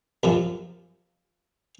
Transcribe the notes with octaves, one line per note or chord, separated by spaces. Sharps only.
F#2 C3 F3